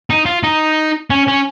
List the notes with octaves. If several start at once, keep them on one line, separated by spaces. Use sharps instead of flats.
D#4
F4
D#4
C#4
C#4